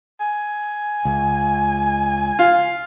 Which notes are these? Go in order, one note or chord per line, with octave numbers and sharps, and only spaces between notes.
G#5
C#2
F4